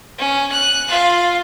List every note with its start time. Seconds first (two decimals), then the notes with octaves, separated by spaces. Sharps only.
0.19 C#4
0.51 F#6
0.88 F4 F5